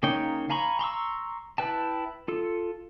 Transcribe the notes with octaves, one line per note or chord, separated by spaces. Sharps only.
C#3 A#3 D#4 C#5 G5
F5 G#5 A#5 B5 C#6
A#5 C6 C#6 E6
E4 B4 G5 A5
F4 A4